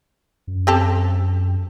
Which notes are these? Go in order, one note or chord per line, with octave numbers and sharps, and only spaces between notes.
F#2
C4 G4 A4